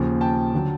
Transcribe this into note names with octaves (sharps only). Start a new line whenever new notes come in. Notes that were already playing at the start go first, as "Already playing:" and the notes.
Already playing: D#2 C#3 F3
G5 A5
D3 F#3